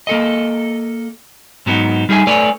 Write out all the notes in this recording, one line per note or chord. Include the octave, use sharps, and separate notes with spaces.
A#3 A4 D#5
G#2 F#3 B3 D#4
G3 D#4 G#4 E5 G#5
A3 A4 B4 C#5 D5 G#5